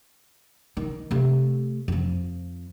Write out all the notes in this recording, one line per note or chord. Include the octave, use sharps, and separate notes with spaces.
D#3
C3 A3
F2 F3